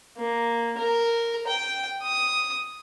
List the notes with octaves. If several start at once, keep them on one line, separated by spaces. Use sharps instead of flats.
A#3
A#4
G5
D#6